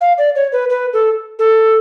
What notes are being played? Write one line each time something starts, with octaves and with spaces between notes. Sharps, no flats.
F5
D5
C#5
B4
B4
A4
A4